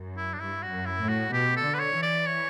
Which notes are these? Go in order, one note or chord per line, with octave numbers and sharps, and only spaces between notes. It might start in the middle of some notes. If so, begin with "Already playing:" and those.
Already playing: F#2
E4
D4
G2 E4
F#4
F#2
E4
A2
F#4
B2 G4
A4
D3
B4
C#5
E3
D5
C#5